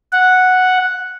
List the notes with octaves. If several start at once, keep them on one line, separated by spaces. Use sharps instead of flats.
F#5